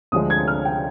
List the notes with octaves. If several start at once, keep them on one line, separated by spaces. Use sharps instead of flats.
D2 D3 F3 G#3 D#6
G#6
F6
G5